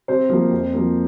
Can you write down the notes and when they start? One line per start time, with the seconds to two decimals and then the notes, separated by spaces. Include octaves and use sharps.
0.08 C3 C5
0.29 F3 A#3
0.51 F2
0.73 F3 A#3